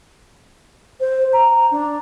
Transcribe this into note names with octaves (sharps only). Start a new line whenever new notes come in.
C5
A#5
D4